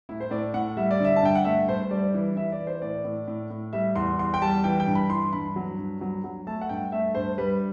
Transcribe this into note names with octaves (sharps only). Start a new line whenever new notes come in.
A2 E4
C5
A2 D5
A2 F#5
G3 E5
D5
D3 E5
A5
G2 G5
F#5
A3 E5
G2 C5
C5
G3 D5
E3
E3 E5
D5
E3
C5
A2 D5
A2
A2
A2
G3 E5
E2 C6
E2 C6
G5
G3 A5
E3 G5
G5
G2
B5
E3 C6
G2 B5
F#3
G2
F#3
F#3
A3 A5
F#5
G2 G5
A3 E5
G2 C5
G3 B4